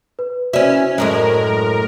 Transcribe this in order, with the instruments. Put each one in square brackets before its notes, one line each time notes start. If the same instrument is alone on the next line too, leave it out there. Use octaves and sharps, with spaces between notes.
[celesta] B4
[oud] C#4 E4 [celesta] F#4 C5 D5
[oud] F#2 A2 G#3 [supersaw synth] A#4